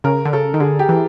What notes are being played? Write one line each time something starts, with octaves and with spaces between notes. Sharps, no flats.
C#3 A#4
D3
C#3 A4
D#3
D3 G#4
G4
E3